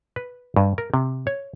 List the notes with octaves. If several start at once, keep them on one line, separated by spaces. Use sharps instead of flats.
B4
G2
A#4
C3
C#5